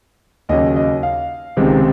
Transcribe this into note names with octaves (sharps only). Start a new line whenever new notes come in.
D#2 C#3 F#3 C#4 D#5
D#5
F5
C#2 C3 D#3 G#3 C4